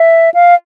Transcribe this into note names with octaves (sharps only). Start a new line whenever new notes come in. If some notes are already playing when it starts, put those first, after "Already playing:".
Already playing: E5
F5